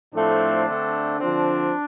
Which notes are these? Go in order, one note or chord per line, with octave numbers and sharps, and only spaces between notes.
A2 F3 A3 C4 D4
D3 A3 C4
D3 F3 C4 D4